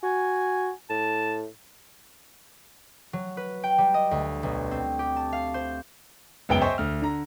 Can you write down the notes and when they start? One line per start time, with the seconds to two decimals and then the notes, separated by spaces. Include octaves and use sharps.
0.03 F#4 G#5
0.90 A2 A5
3.13 F#3
3.37 B4
3.63 G5
3.78 G3
3.94 D#5
4.11 D2
4.43 B1
4.71 C4
4.99 G4
5.16 A5
5.33 F5
5.54 C5
6.49 C#2 F#2 B3 G5 D7 G7
6.61 C5 D#5 E5 G5 G#5 C#6
6.78 D2 F6
7.02 D3 A#5